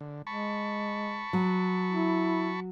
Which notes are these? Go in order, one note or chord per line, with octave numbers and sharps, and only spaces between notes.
D3
G#3 A5 B5 C#6
F#3
E4